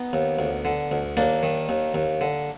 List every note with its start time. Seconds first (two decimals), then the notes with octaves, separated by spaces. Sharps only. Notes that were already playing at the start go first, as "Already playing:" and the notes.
Already playing: B3 D#4
0.13 D#2
0.39 D2
0.65 D3
0.91 D2
1.17 D#2 A#3 D4
1.43 D#3
1.69 D#2
1.94 D#2
2.21 D3